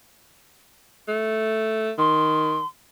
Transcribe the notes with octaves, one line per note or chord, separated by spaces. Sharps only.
A3
D#3 C6